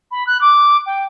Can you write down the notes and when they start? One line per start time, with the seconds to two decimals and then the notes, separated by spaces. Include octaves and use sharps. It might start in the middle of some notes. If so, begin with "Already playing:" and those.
0.11 B5
0.27 F#6
0.41 D6
0.86 G5